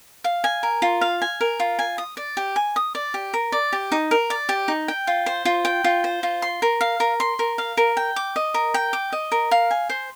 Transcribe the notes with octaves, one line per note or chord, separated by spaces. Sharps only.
F5
G#5
A#4
F4
F5
G#5
A#4
F4
G#5
D#6
D5
G4
G#5
D#6
D5
G4
A#4
D5
G4
D#4
A#4
D5
G4
D#4
G5
F4
C5
F4
G5
F4
C5
F4
C6
A#4
F5
A#4
C6
A#4
F5
A#4
G5
D6
D#5
A#4
G5
D6
D#5
A#4
F5
G#5
C5